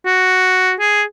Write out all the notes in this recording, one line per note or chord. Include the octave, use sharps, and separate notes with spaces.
F#4
G#4